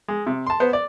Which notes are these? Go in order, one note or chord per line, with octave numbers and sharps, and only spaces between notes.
G#3
C3
A5 C6
B3 C5
D5